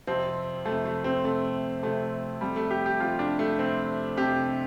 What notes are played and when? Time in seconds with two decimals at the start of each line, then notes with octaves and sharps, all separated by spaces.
0.07 F2 C3 C4
0.66 F2 C3 A3
0.85 A3
1.04 C4
1.24 F2 C3 A3
1.83 F2 C3 A3
2.41 F2 C3 G3
2.56 A3
2.71 G4
2.86 G4
3.00 F2 C3 F4
3.19 D4
3.39 A3
3.59 F2 C3 C4
4.17 F2 C3 G4